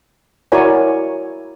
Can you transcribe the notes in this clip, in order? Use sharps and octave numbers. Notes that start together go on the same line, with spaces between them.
E4 F#4 A#4 C#5 D5 G#5